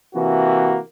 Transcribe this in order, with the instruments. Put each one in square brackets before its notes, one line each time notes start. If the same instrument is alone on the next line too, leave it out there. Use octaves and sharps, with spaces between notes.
[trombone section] C3 E3 A#3 F#4